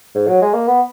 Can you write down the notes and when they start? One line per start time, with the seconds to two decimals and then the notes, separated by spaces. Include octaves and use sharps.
0.15 G#2
0.28 F#3
0.41 G#3
0.53 A#3
0.67 B3